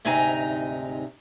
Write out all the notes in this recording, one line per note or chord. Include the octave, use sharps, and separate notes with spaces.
D2 G#2 C3 D#4 G#5 A#5